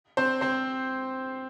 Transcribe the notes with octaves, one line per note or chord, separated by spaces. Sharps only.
C4 C5
C4 C5